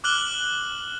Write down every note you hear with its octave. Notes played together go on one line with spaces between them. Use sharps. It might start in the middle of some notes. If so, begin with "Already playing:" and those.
D6 F6 F#6 F#7 G7